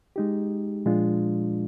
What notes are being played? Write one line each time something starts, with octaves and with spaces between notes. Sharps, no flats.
G#3 D#4 G4
A#2 F3 G#3 D4 F4